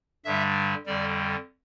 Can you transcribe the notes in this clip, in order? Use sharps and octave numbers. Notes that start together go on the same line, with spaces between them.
G2 D3 G3 E5
F2 D3 G3 D5